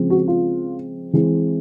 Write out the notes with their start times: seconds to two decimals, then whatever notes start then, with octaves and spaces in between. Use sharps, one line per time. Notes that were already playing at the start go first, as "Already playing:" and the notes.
Already playing: C#3 F3 G#3 C4
0.10 F#4
0.28 F4
1.13 E3 G#3 C4